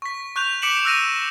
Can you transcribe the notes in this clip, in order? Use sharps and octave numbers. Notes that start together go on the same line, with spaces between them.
C#6 B6
C#6 F#6 G6 F7
D6 B6 C#7 D7 E7 F#7
E6 F#6 A#6 D#7